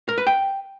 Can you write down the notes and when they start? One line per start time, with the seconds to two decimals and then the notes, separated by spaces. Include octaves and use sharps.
0.09 A#4
0.18 B4
0.27 G5